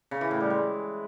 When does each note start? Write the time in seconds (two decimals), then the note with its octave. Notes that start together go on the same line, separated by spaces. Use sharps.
0.11 C#3
0.21 E3
0.31 A2
0.41 G3
0.50 G#3